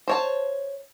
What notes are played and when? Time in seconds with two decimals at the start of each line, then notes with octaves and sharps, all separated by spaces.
0.08 C5 C#5 A5